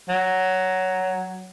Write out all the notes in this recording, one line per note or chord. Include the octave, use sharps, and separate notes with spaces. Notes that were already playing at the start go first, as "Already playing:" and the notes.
F#3